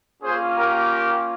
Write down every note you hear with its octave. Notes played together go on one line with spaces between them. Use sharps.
A#3 C#4 F4 G#4 C5
G4 A#4